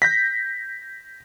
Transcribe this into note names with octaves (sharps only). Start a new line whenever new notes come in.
G6 A#6 B6